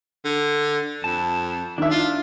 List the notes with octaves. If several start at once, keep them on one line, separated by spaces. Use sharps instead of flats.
D3
F2 A5
D#3 D4 E5
E4 F4